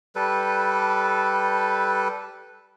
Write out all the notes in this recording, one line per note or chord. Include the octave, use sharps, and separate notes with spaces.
G3 A4 B4